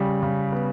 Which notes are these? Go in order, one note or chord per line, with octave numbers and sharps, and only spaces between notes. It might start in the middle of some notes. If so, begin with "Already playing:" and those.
Already playing: C#3 G3
C#3
B3